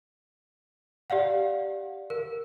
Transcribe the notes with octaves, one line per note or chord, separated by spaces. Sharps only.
G4 D5 F5 F#5
A#4